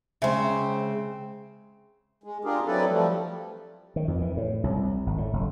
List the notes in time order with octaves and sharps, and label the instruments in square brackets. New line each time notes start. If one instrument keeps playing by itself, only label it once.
[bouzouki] C#3 C4 [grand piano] G#3 E5
[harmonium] G#3
D4 F4 G4 G#4 A#4
F#3 C4 E4 A4 B4 D5
F3 G3 A3
[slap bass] D#3
F2
E3
A2
C2
G#1
A2
F#1